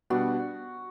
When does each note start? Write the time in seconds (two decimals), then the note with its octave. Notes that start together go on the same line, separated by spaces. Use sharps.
0.10 B2 G3 B3 D4 F#4